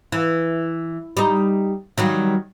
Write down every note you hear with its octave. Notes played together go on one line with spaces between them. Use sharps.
E3
G3 D#4
D#3 F#3 G3